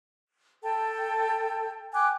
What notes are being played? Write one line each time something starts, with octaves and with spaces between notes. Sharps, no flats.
A4 G5 A5
G5 G#5 D6 F#6